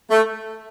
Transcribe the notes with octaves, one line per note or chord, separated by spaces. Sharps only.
A3